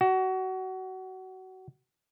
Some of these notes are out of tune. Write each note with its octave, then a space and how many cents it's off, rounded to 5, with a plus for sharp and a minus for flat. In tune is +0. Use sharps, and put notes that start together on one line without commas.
F#4 +25